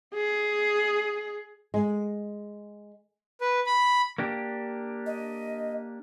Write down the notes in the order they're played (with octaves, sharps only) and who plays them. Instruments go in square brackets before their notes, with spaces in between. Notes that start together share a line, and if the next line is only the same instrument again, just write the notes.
[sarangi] G#4
[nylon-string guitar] G#3
[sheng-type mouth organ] B4
B5
[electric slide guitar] A#3 D4 G4
[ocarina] D#5